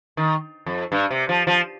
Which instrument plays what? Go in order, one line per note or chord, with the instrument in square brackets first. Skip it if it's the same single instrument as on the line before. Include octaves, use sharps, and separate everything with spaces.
[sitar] D#3
F2
G2
C3
F3
F3